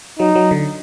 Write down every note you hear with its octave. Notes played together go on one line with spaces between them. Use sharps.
F#3 D#4
F#3
D3